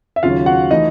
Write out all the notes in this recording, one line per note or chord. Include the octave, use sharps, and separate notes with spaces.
E5
D#2 C#3 F#3 F4 F5
F#4 F#5
E3 A3 D#4 D#5